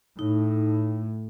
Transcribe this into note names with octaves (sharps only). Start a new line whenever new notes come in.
A2 D#4